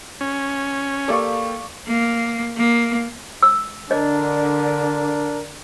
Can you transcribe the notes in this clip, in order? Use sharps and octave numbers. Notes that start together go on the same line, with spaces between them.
C#4
A#3 G4 A4 D5 F5 C#6
A#3
A#3
E6
D3 D4 A#4 D#5